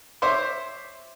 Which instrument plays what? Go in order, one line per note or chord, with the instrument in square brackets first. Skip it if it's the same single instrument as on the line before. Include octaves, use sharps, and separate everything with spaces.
[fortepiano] C5 C#5 E5 C6 D6